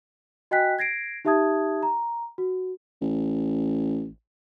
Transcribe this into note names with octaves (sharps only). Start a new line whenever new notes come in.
F#4 D#5 G5 G#5 F#6 B6
G#6 A#6 C7 D7
D#4 G4 E5 A5 D#6 G#6
A#5
F#4
A1